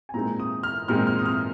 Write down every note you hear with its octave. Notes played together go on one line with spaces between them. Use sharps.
G#5
A#2 G#3 C4 D#4 A#5
D#6
F6
A#2 G#3 C4 D#4 F6
F6
D#6
F6